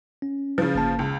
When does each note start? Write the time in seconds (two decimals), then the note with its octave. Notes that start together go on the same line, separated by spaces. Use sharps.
0.22 C#4
0.58 C#3 F3
0.75 G1 A#3 A5
0.99 C#2